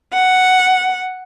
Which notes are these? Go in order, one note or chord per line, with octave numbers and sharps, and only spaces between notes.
F#5